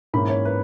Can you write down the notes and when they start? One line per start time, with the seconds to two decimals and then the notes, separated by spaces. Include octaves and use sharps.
0.14 G#2 E3 A#3 C#4 B5
0.29 C#5
0.45 B4